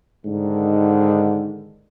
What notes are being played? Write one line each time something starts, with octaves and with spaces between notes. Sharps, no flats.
G#2 D3 D#3